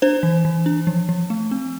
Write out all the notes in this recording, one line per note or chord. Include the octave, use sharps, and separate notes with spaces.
D4 C5
E3
E3
D4
F3
F3
A3
C4